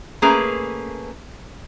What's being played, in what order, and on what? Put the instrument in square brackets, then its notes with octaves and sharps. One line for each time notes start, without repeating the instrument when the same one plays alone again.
[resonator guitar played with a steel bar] A3 A#3 C#4 G#4 B4 A#5